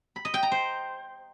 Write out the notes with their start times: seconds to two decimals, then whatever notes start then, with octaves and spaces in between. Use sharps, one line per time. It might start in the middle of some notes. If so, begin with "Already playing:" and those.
0.16 B5
0.25 D#5
0.34 G5
0.43 A#5
0.52 C5